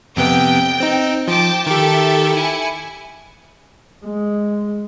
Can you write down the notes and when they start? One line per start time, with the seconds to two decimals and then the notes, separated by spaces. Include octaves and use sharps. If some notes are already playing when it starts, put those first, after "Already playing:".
0.16 F2 C3 B3 G5
0.80 C4 D#4
1.28 F3 G5 A5 D6
1.66 D#3 G4 A4 E5
2.34 E4 G#5 C#7
4.05 G#3